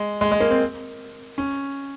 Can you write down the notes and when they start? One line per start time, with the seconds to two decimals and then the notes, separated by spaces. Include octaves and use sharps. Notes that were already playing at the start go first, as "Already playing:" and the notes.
Already playing: G#3
0.21 G#3
0.32 G#3
0.40 A#3
0.51 C4
1.38 C#4